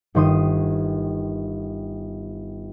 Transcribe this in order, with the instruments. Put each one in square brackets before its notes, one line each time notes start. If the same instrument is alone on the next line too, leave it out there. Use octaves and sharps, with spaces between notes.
[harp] G1 D#3 C6 D#6